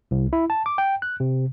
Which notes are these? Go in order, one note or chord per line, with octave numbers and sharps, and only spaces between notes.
C2
E4
A5
D6
G5
F#6
C3